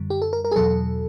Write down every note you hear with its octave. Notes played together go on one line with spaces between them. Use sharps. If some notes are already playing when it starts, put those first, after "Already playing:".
Already playing: F#2 D3 G3
G4
A4
A#4
A#4
G#4
E2 B2 F#3 A4